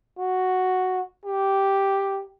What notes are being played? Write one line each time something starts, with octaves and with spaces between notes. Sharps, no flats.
F#4
G4